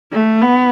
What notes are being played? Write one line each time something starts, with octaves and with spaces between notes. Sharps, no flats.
A3
B3